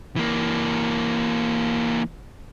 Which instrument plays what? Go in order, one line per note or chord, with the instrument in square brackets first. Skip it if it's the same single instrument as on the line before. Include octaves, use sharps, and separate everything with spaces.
[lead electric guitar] E3 A#3